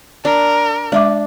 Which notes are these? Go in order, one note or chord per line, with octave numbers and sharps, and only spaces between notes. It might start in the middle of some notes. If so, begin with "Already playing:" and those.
D4 A#4
G#3 D4 E5 D6